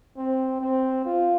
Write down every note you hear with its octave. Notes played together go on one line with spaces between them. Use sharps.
C4
C4
F4